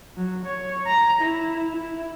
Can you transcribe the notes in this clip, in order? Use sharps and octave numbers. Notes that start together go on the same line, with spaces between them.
F#3
C#5
A#5
E4
E4